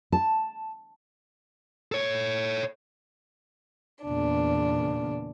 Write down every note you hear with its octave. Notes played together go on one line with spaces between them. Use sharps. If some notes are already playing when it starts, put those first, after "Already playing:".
A5
A4 C#5
E2 A#2 C#3 D4